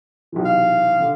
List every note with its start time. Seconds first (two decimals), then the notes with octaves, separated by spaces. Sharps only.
0.32 B1 C3 E3
0.45 F5
1.00 D3